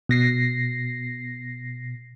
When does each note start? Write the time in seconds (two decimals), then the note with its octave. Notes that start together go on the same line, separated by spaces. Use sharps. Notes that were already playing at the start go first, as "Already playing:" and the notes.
0.09 B2 A#6 C7